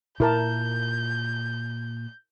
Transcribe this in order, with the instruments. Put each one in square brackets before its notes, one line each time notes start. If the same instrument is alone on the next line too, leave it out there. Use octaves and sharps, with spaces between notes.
[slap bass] A#2 [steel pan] E4 A#4 A5 [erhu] G6